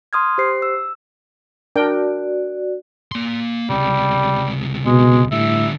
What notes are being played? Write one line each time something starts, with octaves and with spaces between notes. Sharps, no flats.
C6 D#6 F6 G#6
G4 C5 C7
E6
D4 F#4 A#4 D5 G5
A#3 C6
C#2 C3 G3
B2 G#3
A2 D3 G3 E5